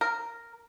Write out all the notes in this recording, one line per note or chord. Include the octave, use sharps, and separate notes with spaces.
A#4